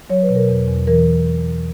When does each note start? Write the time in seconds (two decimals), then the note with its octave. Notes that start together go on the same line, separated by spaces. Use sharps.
0.10 F#3 C#5
0.23 B4
0.29 B2
0.36 A#4
0.49 E2
0.68 E2
0.87 E3 A#4